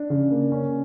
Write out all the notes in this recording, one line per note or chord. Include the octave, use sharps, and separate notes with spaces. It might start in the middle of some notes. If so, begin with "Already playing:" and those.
Already playing: D4
C#3
A#3
C#4